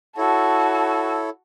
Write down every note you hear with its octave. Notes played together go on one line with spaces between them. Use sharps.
E4 F#4 A4 C#5 A5